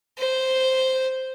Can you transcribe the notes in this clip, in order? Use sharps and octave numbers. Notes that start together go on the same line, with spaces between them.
C5